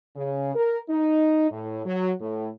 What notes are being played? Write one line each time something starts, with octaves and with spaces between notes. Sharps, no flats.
C#3
A#4
D#4
A2
F#3
A2